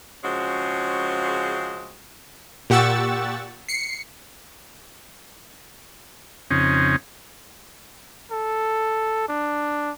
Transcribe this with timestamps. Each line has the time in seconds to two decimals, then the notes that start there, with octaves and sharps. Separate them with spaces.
0.24 C#3 F3 G#3 C4 C#4 F#4
2.70 A#2 G4 F#5 C#6 E6 A6
3.69 C7 C#7
6.51 F2 C#3 C4 C#4 D#4
8.31 A4
9.28 D4